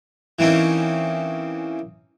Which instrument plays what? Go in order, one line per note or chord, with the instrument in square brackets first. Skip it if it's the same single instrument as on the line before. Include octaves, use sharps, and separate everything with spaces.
[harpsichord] E3 A#3 C4 C#4 D#4